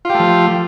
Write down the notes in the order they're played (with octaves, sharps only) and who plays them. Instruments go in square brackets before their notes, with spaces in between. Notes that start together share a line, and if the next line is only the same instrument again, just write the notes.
[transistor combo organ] F4
G4
A3
F3